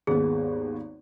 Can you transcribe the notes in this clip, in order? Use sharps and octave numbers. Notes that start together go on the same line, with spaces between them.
G#1 D#2 B3 G#4